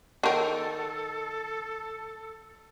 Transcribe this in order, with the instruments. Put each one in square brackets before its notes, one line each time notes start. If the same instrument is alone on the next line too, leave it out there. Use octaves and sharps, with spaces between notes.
[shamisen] D#3 A#4 [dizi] A4